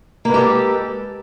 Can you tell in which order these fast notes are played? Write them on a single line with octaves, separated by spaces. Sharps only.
A#3 B4 G#3 G4 A4